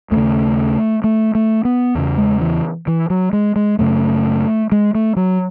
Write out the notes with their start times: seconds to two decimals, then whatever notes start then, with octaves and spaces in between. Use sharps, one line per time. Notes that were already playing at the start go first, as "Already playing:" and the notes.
0.11 D#2 C#3 A3
1.04 A3
1.35 A3
1.65 B3
1.95 E2 C#3
2.18 G#3
2.41 E3
2.87 E3
3.10 F#3
3.33 G#3
3.56 G#3
3.79 F#2 C#3 A3
4.72 G#3
4.95 A3
5.16 F#3